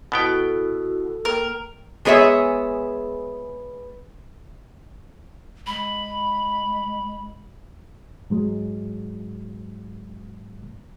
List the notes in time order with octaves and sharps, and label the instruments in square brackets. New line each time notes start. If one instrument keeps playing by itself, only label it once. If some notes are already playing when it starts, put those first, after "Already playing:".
[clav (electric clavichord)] B2 B3 G5 [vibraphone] E4 F#4 [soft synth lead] A4
[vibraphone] A#3 G5 [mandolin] A#4
[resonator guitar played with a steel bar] G#3 B3 G#4 C#5 E5
[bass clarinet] G#3 [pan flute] B5
[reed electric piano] G#2 F#3 G#3